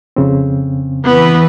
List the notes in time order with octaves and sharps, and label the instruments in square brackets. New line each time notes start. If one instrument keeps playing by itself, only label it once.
[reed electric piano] F2 C#3 C4
[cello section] E3 B4 [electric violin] B3